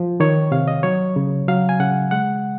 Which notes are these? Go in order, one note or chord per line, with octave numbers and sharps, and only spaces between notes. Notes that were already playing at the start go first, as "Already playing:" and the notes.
Already playing: F3
D#3 C#5
C3 F5
D#5
F#3 C#5
C#3
F#3 F5
G#5
C#3 F#5
G#3 F#5